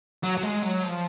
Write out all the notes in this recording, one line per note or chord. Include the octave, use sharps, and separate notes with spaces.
F#3
F#3
G#3
F#3
F3